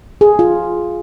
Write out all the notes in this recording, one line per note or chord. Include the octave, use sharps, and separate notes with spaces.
G#4
F4